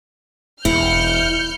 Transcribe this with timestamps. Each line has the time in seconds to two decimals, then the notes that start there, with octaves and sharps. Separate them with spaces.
0.65 E1 E4 F6 G6 C#7